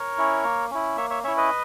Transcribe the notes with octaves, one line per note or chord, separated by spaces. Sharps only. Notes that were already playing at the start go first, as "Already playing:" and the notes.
Already playing: A#4 C#5
C#4 E4
A#3
C#4 E4
A#3 C#5 E5
C#5 E5
C#4 E4 C#5 E5
B4 D#5